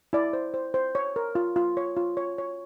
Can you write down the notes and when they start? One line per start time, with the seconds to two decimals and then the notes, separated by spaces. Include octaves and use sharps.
0.13 E4 D5
0.33 C5
0.54 C5
0.74 C5
0.95 C#5
1.16 A#4
1.35 F4
1.56 F4
1.77 C#5
1.96 F4
2.17 C#5
2.38 C#5